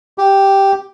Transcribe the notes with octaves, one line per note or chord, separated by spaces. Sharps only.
G4